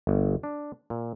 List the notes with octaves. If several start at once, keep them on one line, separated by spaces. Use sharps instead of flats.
G1
D4
A#2